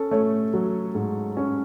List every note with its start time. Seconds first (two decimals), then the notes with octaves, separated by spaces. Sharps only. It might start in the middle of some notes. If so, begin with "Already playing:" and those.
Already playing: C#4 A4
0.11 A3 C#5
0.54 F#3
0.95 G#2
1.37 C#4